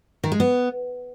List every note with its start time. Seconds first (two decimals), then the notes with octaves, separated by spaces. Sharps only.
0.24 D#3
0.32 G#3
0.40 B3